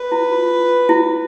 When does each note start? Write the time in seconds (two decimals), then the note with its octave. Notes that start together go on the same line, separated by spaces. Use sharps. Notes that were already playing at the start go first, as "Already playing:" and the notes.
Already playing: B4
0.12 E4
0.32 F4
0.89 E4